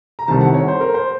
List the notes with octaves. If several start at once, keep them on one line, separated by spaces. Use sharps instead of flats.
A#5
C2 C3 D#3 A5
F#5
C#5
C5
A#4
C5